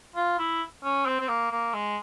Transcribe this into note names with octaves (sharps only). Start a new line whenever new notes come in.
F4
E4
C#4
C4
C4
A#3
A#3
G#3